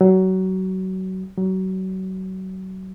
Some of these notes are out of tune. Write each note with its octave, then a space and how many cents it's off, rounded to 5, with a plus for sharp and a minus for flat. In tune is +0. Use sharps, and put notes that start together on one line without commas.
F#3 +25
F#3 +30